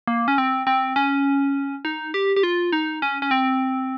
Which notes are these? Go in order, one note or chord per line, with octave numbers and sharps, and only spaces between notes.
A#3
C#4
C4
C4
C#4
D#4
G4
G4
F4
D#4
C#4
C#4
C4